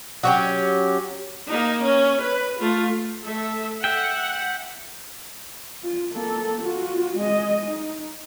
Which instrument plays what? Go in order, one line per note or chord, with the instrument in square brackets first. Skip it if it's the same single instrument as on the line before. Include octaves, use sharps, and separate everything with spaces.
[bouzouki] F#3 C#4 G4
[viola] A#3 D#4
C#4
B4
A3 F4
[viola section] A3 A4 E5
[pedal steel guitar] E5 G5 [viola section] F#5
[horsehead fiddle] F4
A#3 A4
F4 F#4
G#3 D#5
D#4